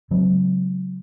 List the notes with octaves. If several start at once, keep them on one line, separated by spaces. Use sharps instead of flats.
C#3 F#3 G#3 C4